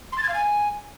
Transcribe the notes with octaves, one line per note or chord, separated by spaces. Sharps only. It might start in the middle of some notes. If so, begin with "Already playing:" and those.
C6
A6
G#6
F5
G#5